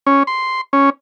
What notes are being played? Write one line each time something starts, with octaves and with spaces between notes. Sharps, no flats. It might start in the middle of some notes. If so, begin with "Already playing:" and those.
C#4
C6
C#4